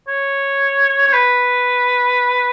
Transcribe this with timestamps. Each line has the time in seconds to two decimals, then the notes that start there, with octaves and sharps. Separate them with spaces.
0.08 C#5
1.07 C#5
1.13 B4